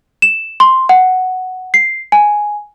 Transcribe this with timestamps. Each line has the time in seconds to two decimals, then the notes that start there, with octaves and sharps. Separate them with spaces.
0.22 E7
0.60 C6
0.89 F#5
1.74 C7
2.12 G#5